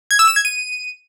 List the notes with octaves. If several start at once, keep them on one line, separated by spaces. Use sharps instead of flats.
G#6
E6
E7
G#6
D#7